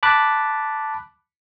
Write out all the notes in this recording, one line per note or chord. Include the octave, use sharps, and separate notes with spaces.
A5 B5 D6 F#6